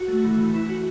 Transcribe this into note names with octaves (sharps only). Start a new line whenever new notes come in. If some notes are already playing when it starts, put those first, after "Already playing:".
Already playing: F#4
A3
E3
E3
E4
F#4